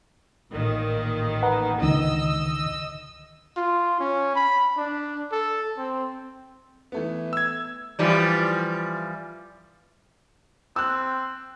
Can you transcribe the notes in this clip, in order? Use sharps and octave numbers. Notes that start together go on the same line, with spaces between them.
A1 A#2 D#3
B4 F#5 A#5
C#2 D3 D#3 D#5 E6
F4
C#4
B5
D4
A4
C4
E3 A3 B3
E6 G#6
E3 F3 G3
C4 E6 F#6